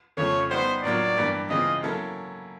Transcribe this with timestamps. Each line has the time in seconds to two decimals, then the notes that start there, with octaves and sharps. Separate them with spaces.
0.17 F2 C#3 F3 A3 C#5
0.50 G3 B3 D#4 C5
0.83 A2 F#3 A#3 D4 F4 D5
1.17 G2 E3 G3 A#3
1.50 C#3 E3 G#3 C4 F4 D#5
1.83 F#3 A#3 C#4 E4 A4